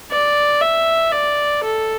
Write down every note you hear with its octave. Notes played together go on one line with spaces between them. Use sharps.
D5
E5
D5
A4